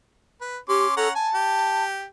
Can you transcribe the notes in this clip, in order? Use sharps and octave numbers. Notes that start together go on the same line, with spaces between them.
B4
C#4 G4 C6 D6
C#4 A4 F#5 A#5
G#5 A5
G4